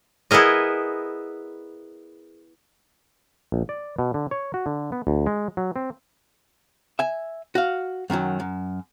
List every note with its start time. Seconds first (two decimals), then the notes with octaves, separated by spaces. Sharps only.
0.31 B3 E4 G#4 A#4 D#5
3.52 A#1
3.69 D5
3.99 B2
4.14 D3
4.31 C#5
4.54 F#4
4.66 D3
4.92 B3
5.07 D2
5.26 G#3
5.57 F#3
5.76 C4
6.99 E5 G#5
7.55 F#4 F5
8.10 F#2 D#3 F3 F#3
8.40 F#2